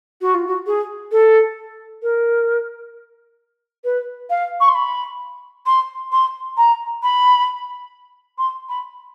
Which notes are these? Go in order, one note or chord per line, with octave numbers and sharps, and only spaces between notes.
F#4
F4
F#4
G#4
A4
A#4
B4
F5
C#6
C6
B5
C6
C6
A#5
B5
C6
B5